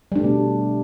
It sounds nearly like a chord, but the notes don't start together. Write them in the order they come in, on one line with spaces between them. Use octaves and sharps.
G3 D4 A3 B2